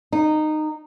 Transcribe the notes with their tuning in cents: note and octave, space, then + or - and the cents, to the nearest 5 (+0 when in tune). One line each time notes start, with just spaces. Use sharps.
D#4 -15